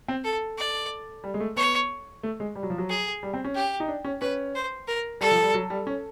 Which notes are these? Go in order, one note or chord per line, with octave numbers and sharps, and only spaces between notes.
C4
A4
D5
G3
G#3
A3
B3 C#5
A3
G#3
G3
F#3
F3
F#3
G#4
G3
C4
C#4
G4
D#4
D4
C#4
C#4 B4
C5
A#4
G3 A4
F3
G3
F#3
G3
C#4